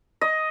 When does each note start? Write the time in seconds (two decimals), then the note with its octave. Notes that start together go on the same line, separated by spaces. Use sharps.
0.21 D#5